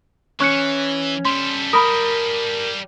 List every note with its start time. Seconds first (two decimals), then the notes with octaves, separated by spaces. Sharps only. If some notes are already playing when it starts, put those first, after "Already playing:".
0.40 E3 C#4 C#6 F#6 C#7
1.25 G3 A4 C6
1.73 A#4 B5 D#6